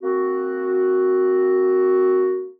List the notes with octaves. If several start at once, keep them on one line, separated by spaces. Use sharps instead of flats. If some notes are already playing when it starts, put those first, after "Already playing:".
A#3 C4 F#4